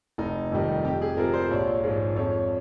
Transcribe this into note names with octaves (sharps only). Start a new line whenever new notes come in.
F1 D#4
F2 C3 D#3 G3
F2 G4
G#4
C3 F3 G#3 A#4
C5
A#1 C#5
G#2 F3 G#3
F2 C#5